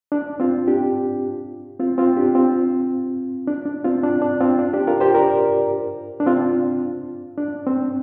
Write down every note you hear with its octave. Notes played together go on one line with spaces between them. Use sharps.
D4
C4 F4
D4 G4
C4 F4
C4 F4
D4 G4
C4 F4
D4
D4
C4 F4
D4
D4
C4 F4
D4
D4 G4
F4 A#4
G4 C5
A#4 D5
D4
C4 F4
D4
C4